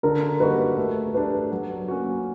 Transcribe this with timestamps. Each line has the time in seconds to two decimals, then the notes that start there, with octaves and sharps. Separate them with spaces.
0.03 D3 A#4
0.40 G3 A#3 D#4 F#4 B4
0.77 A3
1.14 D4 G4 B4
1.52 F#3
1.88 A#3 C#4 F#4